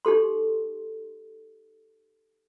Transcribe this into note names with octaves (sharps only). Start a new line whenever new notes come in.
D#4 G4 A4 C6